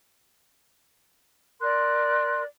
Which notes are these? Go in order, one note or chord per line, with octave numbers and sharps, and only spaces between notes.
A#4 D5 C6 F#6